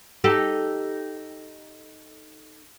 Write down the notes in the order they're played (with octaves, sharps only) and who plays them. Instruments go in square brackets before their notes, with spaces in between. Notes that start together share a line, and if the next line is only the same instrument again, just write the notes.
[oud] D#4 G4 A4